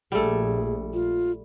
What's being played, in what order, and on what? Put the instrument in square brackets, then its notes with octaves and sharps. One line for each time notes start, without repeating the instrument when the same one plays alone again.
[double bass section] A#1 [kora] G3 A3 [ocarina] G#4
[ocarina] F4